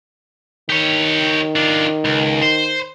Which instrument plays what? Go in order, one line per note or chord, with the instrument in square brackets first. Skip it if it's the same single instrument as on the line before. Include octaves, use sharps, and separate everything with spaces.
[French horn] D#3 [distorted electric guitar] G4 C#5
[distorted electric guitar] D4 F4
C#2
C5